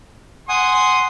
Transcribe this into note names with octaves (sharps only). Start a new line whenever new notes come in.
F#5 G#5 C6 D#6